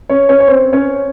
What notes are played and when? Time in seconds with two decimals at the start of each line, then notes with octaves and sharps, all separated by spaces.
0.09 C#4 C#5
0.29 C#4 C#5
0.40 C#5
0.48 C4 C5
0.73 C#4 C#5